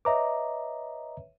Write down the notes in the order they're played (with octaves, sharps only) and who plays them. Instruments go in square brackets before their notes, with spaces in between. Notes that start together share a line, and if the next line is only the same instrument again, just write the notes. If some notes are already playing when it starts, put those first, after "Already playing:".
[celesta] B4 C#5 E5 [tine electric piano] D#5 A#5 D6